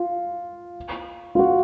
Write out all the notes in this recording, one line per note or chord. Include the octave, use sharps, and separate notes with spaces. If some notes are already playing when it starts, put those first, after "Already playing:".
Already playing: F4
F4
F#4